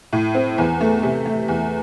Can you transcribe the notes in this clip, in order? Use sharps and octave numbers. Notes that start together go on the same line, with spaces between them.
A2
C4
E2
A3
C3
A3
E2